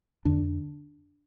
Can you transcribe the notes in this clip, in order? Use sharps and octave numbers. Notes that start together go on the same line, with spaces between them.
F2 D3 D4